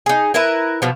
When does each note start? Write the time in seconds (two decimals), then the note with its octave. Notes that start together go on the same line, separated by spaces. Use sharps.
0.06 D#4 G#4
0.34 E4 A#4 B4 E5
0.82 B2 F3